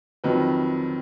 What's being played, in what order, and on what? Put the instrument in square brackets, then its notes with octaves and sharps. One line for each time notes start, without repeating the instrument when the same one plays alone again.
[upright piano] F2 C3 D#3 F#3 B4